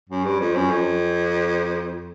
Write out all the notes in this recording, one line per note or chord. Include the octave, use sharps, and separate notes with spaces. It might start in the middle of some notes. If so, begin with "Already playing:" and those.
F#2
G2
F2
F#2
F2